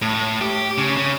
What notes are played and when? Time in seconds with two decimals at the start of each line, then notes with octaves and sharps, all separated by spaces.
0.02 A2
0.41 G4
0.78 C#3
0.97 C#3